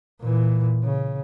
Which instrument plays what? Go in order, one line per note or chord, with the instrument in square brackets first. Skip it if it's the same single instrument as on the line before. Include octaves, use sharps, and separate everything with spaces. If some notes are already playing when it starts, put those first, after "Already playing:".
[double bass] A#2 E3
C#3